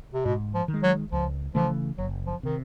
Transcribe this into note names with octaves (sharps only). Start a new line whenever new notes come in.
C3
G#2 B2
F3
D#3
G#3
F#3
C#2 F3
C#3 E3 F3 A3
F#1 F#3
F3
C3 D#3